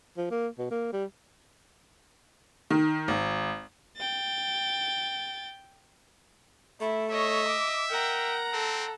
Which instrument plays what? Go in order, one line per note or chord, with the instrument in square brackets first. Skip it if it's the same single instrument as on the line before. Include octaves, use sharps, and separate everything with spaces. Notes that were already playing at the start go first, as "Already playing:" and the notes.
[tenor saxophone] F3
A#3
B2
A#3
G3
[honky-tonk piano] D#3
G#1
[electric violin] G5 A6
[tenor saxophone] A3 [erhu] E4
[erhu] C#5 [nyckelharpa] D#5 [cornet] E5
[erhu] D6
[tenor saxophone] A#4 [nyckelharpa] F#5 A#5 [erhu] G5
[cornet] C4 [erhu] A4